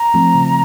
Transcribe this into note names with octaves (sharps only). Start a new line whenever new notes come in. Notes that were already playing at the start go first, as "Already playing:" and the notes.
Already playing: A#5
F3 A3 C4
C#3